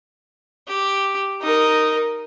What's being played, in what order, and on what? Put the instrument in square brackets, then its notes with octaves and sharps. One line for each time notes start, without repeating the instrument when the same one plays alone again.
[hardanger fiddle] G4
[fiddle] D#4 A#4 [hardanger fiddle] D#5